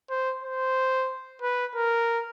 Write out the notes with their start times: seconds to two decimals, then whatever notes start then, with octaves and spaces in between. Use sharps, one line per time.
0.10 C5
0.43 C5
1.42 B4
1.75 A#4